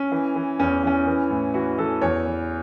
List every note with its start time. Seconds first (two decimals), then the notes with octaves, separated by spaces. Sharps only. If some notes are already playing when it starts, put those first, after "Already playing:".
Already playing: C#4
0.12 E3
0.35 E3
0.59 E2 C#4
0.83 E3 C#4
1.07 E3
1.31 A2
1.54 E3 F#4
1.78 E3 A4
2.02 E2 C#5
2.26 E3